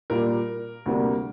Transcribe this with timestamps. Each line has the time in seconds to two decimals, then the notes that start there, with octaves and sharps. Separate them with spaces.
0.10 A#2 G3 A#3 A#4
0.86 D2 C3 G3 A#3